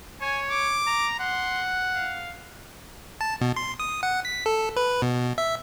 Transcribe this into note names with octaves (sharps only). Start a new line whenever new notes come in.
C#5 G#5
D6
A#5
F#5 C6
F5
A5
B2
C6
D#6
F#5
B6
A4
B4
B2
E5